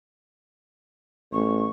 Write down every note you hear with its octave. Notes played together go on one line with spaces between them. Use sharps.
A1 C#6